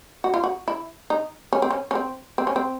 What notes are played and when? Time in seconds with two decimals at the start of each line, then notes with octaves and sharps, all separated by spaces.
0.24 F#4
0.34 F4
0.44 F#4
0.68 E4
1.10 D#4
1.53 C#4
1.62 C4
1.70 C#4
1.91 C#4
1.95 C4
2.38 C4
2.47 C#4
2.56 C4